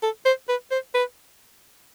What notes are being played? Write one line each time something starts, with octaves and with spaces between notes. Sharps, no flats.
A4
C5
B4
C5
B4